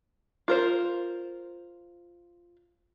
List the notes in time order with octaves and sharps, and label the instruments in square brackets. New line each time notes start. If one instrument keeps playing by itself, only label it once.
[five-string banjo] F4 A#4 C5